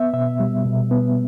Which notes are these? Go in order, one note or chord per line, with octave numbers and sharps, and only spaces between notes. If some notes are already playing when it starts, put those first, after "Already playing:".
Already playing: B3 E5
B2 E5
G3
B2
B3